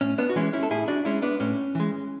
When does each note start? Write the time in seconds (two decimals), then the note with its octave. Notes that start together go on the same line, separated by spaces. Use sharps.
0.01 A2 C#4
0.18 B3 D4
0.30 F#4
0.36 E3 G#3 C#4 E4
0.53 C#4 E4
0.63 A4
0.70 A2 E4 G#4
0.88 D4 F#4
1.05 G#3 C#4 E4
1.22 B3 D4
1.40 A2 C#4
1.75 E3 G#3